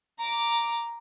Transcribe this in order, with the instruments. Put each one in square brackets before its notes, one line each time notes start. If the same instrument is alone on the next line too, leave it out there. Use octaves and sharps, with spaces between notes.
[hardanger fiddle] A#5 D6